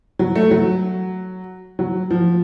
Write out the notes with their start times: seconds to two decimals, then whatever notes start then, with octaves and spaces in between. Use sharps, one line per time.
0.19 F#3
0.35 A3
0.51 F#3
1.79 F#3
2.10 F3